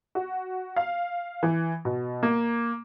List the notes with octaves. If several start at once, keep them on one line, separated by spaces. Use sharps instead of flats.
F#4
F5
E3
B2
A#3